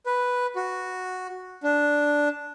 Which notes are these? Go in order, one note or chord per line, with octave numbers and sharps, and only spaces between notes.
B4
F#4
D4